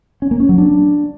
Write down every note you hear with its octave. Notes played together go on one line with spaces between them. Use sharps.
C#4
A#3
C#4
F#3
D4